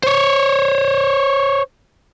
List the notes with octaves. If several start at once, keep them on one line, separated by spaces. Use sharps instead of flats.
C5 C#5